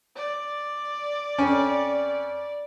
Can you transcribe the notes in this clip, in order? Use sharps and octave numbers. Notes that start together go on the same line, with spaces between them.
D5
F2 C#4